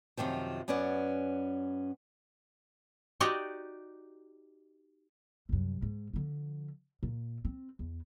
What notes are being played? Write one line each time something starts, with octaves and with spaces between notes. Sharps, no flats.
F#2 A2 C3 D#3 F3
F#2 B3 C#4 D5 F#5
D#4 F#4 G4 D5 D#5
C2 F#2
G#2
D3 F3
A#2
C4
E2